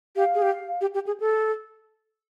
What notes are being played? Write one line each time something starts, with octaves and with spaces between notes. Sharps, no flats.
G4 F5
G#4
G4
G4
G4
G#4
A4